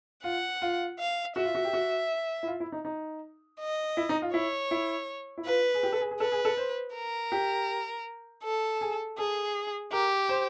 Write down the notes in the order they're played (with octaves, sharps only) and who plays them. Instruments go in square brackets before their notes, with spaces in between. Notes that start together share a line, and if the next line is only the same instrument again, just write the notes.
[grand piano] F4 [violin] F#5
[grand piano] F4
[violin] F5
[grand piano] F#4 [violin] E5
[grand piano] F4
F#4
G4
F#4
E4
F4
E4
D#4
D#4
[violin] D#5
[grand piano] E4
D#4
F4
[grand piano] E4 [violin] C#5
[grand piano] E4
E4
[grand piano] F4 [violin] B4
[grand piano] G#4
G4
A4
G#4
G#4
[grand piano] A4 [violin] B4
[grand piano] G#4
A4
C5
[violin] A#4
[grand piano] G4
[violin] A4
[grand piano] G#4
[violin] G#4 [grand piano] A4
[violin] G4 [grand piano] A#4
[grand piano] C5